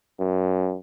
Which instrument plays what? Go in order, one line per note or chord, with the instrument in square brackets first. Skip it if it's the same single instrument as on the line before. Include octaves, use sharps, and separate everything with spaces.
[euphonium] F#2